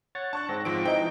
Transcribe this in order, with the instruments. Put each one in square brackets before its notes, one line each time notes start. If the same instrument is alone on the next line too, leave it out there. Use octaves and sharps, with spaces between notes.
[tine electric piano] C#5 F#5 [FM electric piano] A6
[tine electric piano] D4 [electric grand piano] A5 C#6 F#6
[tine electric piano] G#2 C4 [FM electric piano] A#6
[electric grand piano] G#2 F3 D7 [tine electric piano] C4
[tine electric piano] E3 D#4 G6 [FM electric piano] C5 D#5 [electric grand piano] G5